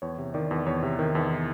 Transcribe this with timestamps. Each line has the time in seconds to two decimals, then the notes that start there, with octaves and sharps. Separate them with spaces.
0.02 E2 C#5
0.18 C3
0.34 D#3 D5
0.51 E2
0.66 E2 C#5
0.83 C3
0.99 D#3
1.15 E2